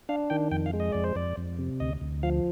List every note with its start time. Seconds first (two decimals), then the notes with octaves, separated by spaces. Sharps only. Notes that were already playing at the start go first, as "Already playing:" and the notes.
0.09 D4 F5
0.30 D#3 G5
0.52 F2 G5
0.66 F5
0.73 G#3
0.80 D#5
0.92 F2 D5
1.04 C5
1.15 F2 D5
1.37 F2
1.59 C3
1.80 D2 D#5
2.01 D2
2.23 F3 F5